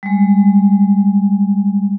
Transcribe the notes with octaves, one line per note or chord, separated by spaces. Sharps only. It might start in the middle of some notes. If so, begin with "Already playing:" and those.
G3 G#3